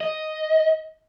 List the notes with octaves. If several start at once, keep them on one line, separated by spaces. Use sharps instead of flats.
D#5